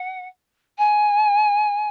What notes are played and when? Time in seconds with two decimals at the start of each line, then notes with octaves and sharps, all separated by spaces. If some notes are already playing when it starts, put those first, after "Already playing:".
Already playing: F#5
0.78 G#5